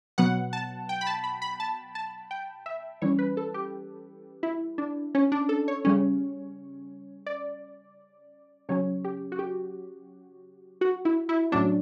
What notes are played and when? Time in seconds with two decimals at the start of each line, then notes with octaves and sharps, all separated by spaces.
0.18 B2 F#3 B3 F#5
0.53 A5
0.89 G5
1.01 B5
1.07 A5
1.24 B5
1.42 B5
1.60 A5
1.95 A5
2.31 G5
2.66 E5
3.02 E3 G3 C#4 C#5
3.19 B4
3.37 A4
3.54 G4
4.43 E4
4.78 D4
5.15 C#4
5.32 D4
5.49 A4
5.68 C#5
5.85 C#3 G3 C#4
7.26 D5
8.69 C#3 F#3 C#4 C#5
9.05 G4
9.32 F#4
9.39 G4
10.81 F#4
11.05 E4
11.29 E4
11.52 A2 F#3 C#4 D4